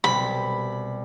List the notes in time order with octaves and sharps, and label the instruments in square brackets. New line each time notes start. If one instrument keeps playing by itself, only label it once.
[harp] C2 B2 G3 [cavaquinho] B5